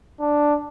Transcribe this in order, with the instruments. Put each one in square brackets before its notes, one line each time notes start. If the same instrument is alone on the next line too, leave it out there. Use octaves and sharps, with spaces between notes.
[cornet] D4